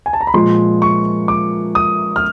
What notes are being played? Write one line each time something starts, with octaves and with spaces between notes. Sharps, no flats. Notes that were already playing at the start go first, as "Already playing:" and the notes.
G#5
A5
A#5
B5
A#2 F3 G#3 C6
C#6
D6
D#6
F6